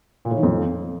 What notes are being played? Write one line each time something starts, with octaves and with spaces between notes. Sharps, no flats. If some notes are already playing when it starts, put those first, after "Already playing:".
A#2
A2
D#3
F2